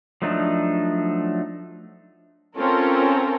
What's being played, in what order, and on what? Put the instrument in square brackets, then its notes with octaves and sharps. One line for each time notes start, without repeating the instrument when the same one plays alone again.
[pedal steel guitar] F3 F#3 A3 D4 D#4
[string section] C4 C#4 F4 A4 A#4